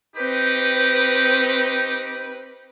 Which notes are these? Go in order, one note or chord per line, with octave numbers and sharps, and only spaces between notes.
C4 D#4 G4 B4